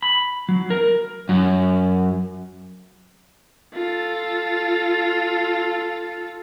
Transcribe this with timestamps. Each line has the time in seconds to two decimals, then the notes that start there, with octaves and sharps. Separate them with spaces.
0.03 B5
0.49 F#3
0.70 A#4
1.29 F#2
3.74 F4 A4